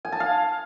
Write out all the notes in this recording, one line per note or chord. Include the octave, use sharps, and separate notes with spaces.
G#5
A5
F5